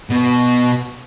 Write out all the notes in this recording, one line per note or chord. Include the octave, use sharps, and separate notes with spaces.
B2 B3